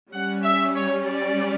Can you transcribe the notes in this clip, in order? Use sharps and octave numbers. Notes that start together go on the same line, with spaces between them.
G3 C#4 F#5
E5
C#5
D5